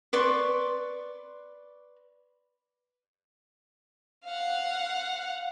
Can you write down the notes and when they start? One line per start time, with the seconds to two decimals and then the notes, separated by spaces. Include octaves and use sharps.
0.13 B4 D5 C6 C#6
4.26 F5 F#5